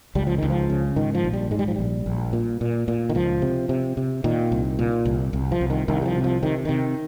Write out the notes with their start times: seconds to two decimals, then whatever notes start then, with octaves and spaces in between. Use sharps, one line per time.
0.15 C#2 G3
0.27 F3
0.38 C#2 D#3
0.50 F3
0.70 C#3
0.96 G#2 D#3
1.14 F3
1.24 A#1
1.33 G3
1.51 G#2 G#3
1.59 G3
1.68 F3
1.76 A#1 G3
2.06 A#1
2.33 A#2
2.61 A#2
2.88 A#2
3.10 D#3
3.15 C#2 F3
3.42 C3
3.69 C3
3.97 C3
4.24 A#2 D#3
4.52 C2
4.79 A#2
5.05 C2
5.33 C2
5.52 F3
5.61 C2
5.70 D#3
5.88 C2 D#3
6.02 G3
6.06 F3
6.15 C3
6.24 F3
6.42 C3 D#3
6.65 C3 D#3